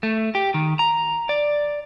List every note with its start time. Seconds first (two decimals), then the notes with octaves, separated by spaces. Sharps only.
0.03 A3
0.35 G4
0.54 D#3
0.79 A#5
1.29 D5